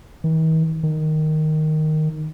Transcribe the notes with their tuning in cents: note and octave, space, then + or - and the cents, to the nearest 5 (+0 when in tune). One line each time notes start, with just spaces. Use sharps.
D#3 +45
D#3 -5